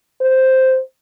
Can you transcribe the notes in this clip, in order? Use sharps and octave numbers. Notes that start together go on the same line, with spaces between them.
C5